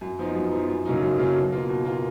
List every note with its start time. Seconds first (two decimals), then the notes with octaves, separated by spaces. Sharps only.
0.01 F#2
0.19 F3 B3 D#4
0.35 F#2
0.51 F3 B3 D#4
0.69 F#2
0.85 C#3 F#3 A#3 D#4
1.02 F#2
1.18 C#3 F#3 A#3 D#4
1.35 B2
1.52 A#3 F4
1.69 B2
1.85 A#3 F4